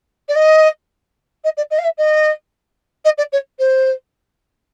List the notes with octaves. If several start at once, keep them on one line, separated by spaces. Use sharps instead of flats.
D5
D#5
D#5
D5
D#5
F5
E5
D#5
D#5
D5
C#5
C5